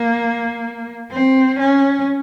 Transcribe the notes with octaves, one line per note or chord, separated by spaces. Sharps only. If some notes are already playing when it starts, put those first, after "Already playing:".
Already playing: A#3
C4
C#4